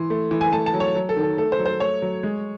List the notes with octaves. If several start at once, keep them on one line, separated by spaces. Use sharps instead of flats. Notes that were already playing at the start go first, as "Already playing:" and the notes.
Already playing: E3 C6
A3
E3
G#5
A3 A5
A5
F#3
C#5
F#3
A4
D#3
A4
A3 A4
C5
F#3
C5
A3 C#5
F#3
G#3